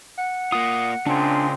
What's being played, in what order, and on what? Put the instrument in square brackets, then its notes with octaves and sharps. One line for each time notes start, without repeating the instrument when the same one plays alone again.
[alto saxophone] F#5
[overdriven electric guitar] A#3 F4 [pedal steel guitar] D#6
[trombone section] A#2 G#3 C4 [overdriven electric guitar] C#3 [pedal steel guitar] D4